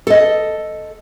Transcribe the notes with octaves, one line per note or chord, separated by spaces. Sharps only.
A4 D#5